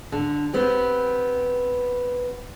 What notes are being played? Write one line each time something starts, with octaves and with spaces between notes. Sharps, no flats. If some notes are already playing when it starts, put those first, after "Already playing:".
D3
B3 C4 G4